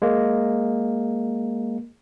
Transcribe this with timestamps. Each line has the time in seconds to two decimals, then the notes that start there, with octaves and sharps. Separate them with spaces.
0.02 G#3 A#3